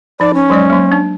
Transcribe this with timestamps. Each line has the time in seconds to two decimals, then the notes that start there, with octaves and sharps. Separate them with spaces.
0.20 F3 D#4 D5
0.34 C#4
0.50 F#3 G#3 D5
0.70 F#3 A#3
0.92 D4